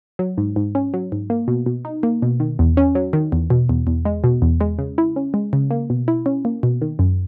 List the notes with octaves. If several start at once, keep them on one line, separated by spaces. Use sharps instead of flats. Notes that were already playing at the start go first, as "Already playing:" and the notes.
F#3
G#2
G#2
C#4
F#3
G#2
A#3
B2
B2
D#4
A#3
B2
D#3
E2
C#4
F#3
D#3
E2
B2
E2
E2
G#3
B2
E2
G#3
C#3
E4
C#4
G#3
C#3
A#3
B2
E4
C#4
A#3
B2
D#3
F#2